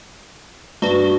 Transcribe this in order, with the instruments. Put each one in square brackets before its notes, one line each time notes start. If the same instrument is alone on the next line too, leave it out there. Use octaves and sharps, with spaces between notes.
[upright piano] G2 [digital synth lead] F#4 [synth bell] B4 G7